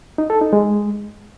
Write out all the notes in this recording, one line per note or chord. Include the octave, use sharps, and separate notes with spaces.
D#4
A4
D#4
G#3